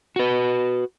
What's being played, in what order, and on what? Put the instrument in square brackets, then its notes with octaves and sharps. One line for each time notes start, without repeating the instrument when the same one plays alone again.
[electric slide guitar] F#4 B4